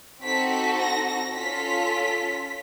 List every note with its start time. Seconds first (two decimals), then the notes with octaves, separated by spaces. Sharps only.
0.23 C4 D#4 F#4 A4 B6
0.51 B6
0.79 A#6
1.07 A#6
1.35 C#4 F4 A4 B6